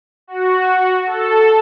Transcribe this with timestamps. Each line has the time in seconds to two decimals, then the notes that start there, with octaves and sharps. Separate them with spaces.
0.27 F#4
1.06 A4